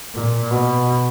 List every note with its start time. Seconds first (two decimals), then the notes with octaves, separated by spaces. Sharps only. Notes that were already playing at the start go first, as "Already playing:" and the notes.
0.14 A#2
0.50 B2